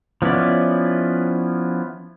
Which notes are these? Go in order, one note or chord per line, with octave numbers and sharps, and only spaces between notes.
F3 B3 C#4 E4 D5